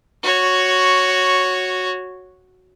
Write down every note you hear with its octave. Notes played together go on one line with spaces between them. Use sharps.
F#4 C#5